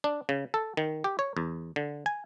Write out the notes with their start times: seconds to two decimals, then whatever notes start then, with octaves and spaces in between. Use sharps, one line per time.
0.04 D4
0.29 C#3
0.54 A4
0.77 D#3
1.04 G4
1.19 C#5
1.37 E2
1.76 D3
2.06 G#5